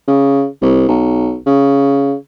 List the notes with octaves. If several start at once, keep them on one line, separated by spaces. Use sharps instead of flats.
C#3
C2
B1
C#3